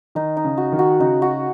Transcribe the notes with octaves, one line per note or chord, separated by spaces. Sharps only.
D#3 D#4
D#4
C#3
F#4
D#3
F#4
C#3 D#4
F#4